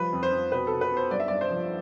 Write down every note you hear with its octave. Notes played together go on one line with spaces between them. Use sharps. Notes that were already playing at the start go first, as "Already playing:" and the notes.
Already playing: F3 G3 B4
F2
C5
F2
B2 B4
B2 A4
B4
B3
C5
G2 D5
E5
G2 D5
C5
F3